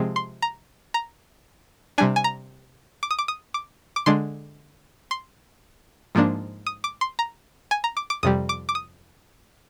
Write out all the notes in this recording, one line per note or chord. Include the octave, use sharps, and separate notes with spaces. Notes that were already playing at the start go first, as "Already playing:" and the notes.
Already playing: C3 F3 G#3 C4
C6
A#5
A#5
C3 G3 D4 G#5
G#5
A#5
D6
D#6
D6
D#6
D6
D6
D3 G#3 D4 C6
C6
G#2 F3 A#3 D4
D#6
D6
C6
A#5
G#5
A#5
D6
D6
F2 C3 G3 D#6
D6
D6
D#6